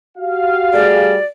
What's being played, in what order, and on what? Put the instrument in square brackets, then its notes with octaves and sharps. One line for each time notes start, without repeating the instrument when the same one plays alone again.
[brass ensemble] F#4 G4 F5
[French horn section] G3 A3 G#4 [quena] D5